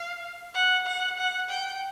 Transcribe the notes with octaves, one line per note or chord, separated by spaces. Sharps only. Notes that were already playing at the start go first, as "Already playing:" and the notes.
Already playing: F5
F#5
F#5
F#5
G5